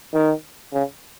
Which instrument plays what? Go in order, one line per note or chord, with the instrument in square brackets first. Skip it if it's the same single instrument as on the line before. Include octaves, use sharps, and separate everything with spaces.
[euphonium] D#3
C#3